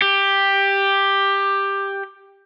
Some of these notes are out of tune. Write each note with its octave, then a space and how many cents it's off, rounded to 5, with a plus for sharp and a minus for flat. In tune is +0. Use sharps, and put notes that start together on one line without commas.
G4 +10